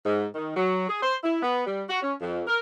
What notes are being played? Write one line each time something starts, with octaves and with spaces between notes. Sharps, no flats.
G#2
D#3
F#3
G#4
C5
E4
B3
G3
F#4
C#4
F2
A#4